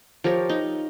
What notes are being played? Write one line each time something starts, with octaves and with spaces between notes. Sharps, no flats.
F3 G4 A#4 C#5
D#4